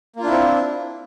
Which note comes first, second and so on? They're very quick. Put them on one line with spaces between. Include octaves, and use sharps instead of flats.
A#3 F4 D4 E4 C4